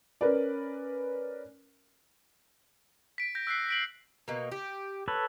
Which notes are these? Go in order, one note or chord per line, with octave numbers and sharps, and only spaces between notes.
C#4 A#4 B4 D5
B6 D7
G6 A#6
E6 F#6 B6 C7
B6 D7 F#7
B2 A#3
G4
A4 B4 C#5